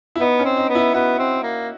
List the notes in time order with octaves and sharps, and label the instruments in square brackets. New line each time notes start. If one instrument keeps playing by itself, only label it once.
[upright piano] E4
[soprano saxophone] B3 [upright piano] D#4
[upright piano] C#4
[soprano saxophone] C4
[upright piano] D#4
[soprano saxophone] B3
[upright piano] E4
[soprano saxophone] B3 [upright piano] F#4
[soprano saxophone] C4
A#3